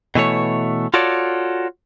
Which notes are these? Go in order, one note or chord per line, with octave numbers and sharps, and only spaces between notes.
B2 E3 A3 C#5
F4 F#4 A4 C#5 D5